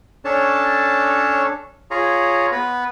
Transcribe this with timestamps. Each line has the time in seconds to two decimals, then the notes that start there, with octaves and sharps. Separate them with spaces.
0.25 C#4 D4 A4 C#5 A5
1.91 F4 G#4 C#5 A#5
2.52 B3 B4